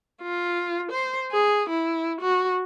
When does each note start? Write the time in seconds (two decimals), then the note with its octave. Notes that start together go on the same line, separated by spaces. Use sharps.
0.22 F4
0.91 C5
1.32 G#4
1.69 E4
2.21 F#4